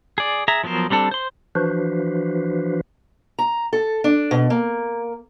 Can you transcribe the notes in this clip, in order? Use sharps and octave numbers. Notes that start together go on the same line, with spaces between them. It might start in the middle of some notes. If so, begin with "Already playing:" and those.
G#4 D5
G#4 E5 A#5
F3 F#3 B3 A#4 C5
G3 C4 D4 A4
C5 C6
E3 F3 D4 F#4 B4 C5
A#5
A4
D4
B2
A#3